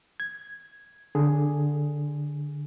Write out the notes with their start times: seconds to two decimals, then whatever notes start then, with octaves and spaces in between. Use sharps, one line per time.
0.20 G#6
1.15 D3 G#4